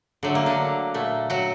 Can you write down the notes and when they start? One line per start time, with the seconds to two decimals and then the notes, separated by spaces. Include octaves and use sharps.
0.23 D3 F#3 A3
0.35 A#3
0.46 D3 D4
0.94 A#2 A3
1.30 F#3 F#4